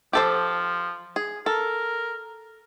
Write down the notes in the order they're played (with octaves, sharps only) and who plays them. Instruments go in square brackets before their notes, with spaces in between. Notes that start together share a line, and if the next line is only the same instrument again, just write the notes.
[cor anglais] F3 [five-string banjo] G4 A4 C5
[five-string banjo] G#4
[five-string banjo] A4 [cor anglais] A#4